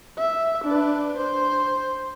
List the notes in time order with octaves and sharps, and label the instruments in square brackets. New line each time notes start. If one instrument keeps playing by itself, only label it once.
[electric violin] E5
D4 B4
C5